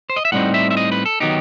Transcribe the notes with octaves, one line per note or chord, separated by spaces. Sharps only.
C5
D#5
E5
A2 G3 C4 D#4 F#5
E5
E5
D#5
B4
A4
D#3 F#3 B3 D#4 G4